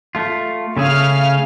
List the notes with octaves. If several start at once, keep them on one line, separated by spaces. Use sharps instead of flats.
A3 F4
C#3 A3 G#4 F5 F6